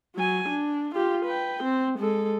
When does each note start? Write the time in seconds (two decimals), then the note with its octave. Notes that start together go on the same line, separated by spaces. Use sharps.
0.16 F#3 G#5
0.49 D4
0.95 F4 G4
1.26 B4 G5
1.63 C4
1.99 G#3 A4